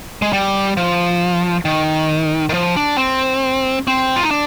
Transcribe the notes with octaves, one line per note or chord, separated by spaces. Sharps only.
G#3
G3
F3
D#3
D#3
F3
D4
C4
C4
F4
D#4
D4